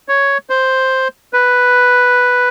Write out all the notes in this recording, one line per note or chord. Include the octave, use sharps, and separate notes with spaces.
C#5
C5
B4